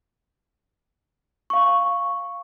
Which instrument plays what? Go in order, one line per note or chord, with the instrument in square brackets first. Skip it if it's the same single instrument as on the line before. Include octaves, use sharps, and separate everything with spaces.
[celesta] F5 C#6